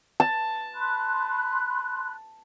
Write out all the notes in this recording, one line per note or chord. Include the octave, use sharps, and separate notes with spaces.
A5
B5 C6 F#6